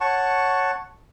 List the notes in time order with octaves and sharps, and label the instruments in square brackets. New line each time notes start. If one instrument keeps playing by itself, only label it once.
[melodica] C#5 F#5 A5 C#6